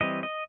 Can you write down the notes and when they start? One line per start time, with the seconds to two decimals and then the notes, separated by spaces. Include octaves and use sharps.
0.01 E3 G3 C4 D#5
0.23 D#5